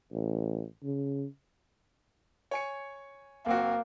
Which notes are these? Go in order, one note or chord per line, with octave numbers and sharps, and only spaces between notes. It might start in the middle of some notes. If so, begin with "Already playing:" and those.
A1
C#3
C#5 G#5 C#7
F#1 A#3 C4 F#4